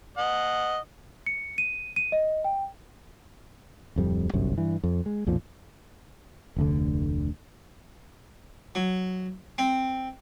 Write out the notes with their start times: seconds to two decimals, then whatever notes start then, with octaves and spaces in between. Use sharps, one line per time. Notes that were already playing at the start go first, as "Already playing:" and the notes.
0.18 D#5 F#5
1.26 C#7
1.58 D#7
1.96 D#7
2.12 D#5
2.44 G5
3.96 D1 F2 G3
4.34 G1 C2 F#2
4.58 G2 E3
4.83 F2
5.06 G#3
5.26 B1 F2 A#2 F3
6.56 F1 D2 D3
8.75 F#3
9.58 C4